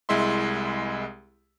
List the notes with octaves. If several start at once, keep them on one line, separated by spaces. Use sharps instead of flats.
C2 G#3 E4 E5 C6